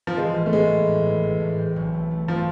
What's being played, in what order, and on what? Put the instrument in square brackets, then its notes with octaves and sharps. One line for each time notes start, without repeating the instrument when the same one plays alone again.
[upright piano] F3
[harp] E3 [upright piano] G#3
[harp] A1
[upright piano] A3
[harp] A1 [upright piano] G#3
[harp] B3
A2
E3
A1
A2
C4
B1
A3
A3
[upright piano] F3 [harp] A3